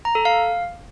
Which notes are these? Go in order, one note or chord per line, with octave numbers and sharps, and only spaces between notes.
A#5
A4
F5